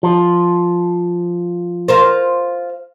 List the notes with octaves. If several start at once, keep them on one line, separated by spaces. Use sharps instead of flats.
F3
F4 A#4 C5